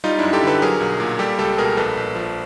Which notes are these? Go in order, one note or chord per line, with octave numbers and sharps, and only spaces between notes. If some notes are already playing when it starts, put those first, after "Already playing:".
G3 D#4 F4
F#2 D4 E4
G4 A4
D3 A4 B4
F#3 G#4 A#4
B1
A#2
G3 G4 A4
C#2 G4 A4
B2 G#4 A#4
A#1 A4 B4
A#1
F3